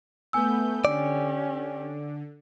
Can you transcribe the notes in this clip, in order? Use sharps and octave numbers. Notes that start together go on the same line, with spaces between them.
A3 B3 G#5 E6 G6
D3 C#4 G4 D5